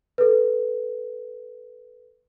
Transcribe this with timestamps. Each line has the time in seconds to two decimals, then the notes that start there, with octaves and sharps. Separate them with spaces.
0.18 A4 B4